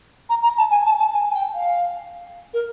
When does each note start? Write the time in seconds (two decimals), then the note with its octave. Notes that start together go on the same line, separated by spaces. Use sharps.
0.29 A#5
0.43 A#5
0.57 A5
0.70 G#5
0.86 A5
0.99 A5
1.13 G#5
1.30 G#5
1.34 G5
1.54 F5
2.53 A#4